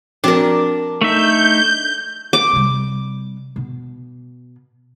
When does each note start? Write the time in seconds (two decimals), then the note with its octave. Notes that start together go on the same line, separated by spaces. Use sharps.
0.24 F3 C4 D4 F#4 A#4
1.01 A3 D#4 E5 G6
2.33 D6
2.53 C3 G3
3.56 B2